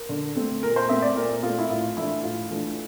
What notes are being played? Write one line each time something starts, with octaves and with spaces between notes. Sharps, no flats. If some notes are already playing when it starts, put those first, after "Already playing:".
Already playing: A#4
D3
A3 C4
A#2 A#4
C5
A3 C4 E5
D5
A#2 A#4
A3 C4 F4
E4
A2 F4
E3 A3 D4 E4
A2 F4
E3 A3 D4